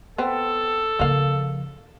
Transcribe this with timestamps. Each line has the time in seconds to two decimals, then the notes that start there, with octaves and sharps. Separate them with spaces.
0.18 B3 C4 A4
0.99 C#3 F3 A#3 F5